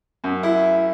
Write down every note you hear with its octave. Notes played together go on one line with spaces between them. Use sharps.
F#2
E4